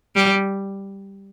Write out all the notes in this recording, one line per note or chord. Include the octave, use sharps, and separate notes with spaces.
G3